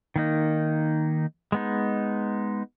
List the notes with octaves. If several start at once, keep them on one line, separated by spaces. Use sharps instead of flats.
D#3 A#3 D#4
G#3 B3 D#4